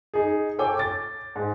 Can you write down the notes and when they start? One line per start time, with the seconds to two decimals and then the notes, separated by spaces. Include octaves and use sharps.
0.14 D#4 G#4
0.59 A4 C#5 G5 G#5 D6
0.77 D6 A6
1.36 G#2